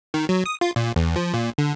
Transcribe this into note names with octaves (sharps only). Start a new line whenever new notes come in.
D#3
F#3
D#6
F4
A#2
E2
F3
A#2
D3